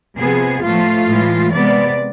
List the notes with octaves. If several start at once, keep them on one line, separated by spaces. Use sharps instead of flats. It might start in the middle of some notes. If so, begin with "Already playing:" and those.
C3 F3 B3 G#4
A2 F3 A3 F4
A2 E3 G#3
C3 G#3 B3 D5